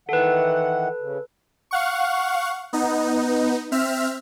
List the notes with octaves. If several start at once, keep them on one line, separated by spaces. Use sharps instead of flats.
D#3 E3 A4 B4 F#5
C#3
F5 F#5 C#6
B3 D#4
C4 E5 F6